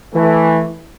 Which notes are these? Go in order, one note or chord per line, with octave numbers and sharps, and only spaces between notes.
E3 A3